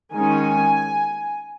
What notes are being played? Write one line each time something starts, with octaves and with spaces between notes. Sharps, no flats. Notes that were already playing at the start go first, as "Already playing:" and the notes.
D#3 G#3 C#4 G#5